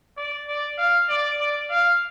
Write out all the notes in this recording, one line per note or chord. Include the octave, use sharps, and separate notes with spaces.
D5
D5
F5
D5
D5
F5